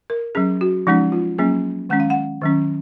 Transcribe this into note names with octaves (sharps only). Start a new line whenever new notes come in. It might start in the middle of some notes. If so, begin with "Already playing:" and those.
A#4
F#3 C#4 G#4
F#4
F3 G#3 C#4 D#4
F4
F#3 A#3 C#4 G#4
D#3 G#3 C#4 F#5
F5
F#5
D#3 F#3 C#4